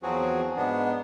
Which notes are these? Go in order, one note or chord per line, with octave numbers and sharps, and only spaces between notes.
E2 F3 F#3 C4 F#4 G#4
G#2 B3 D4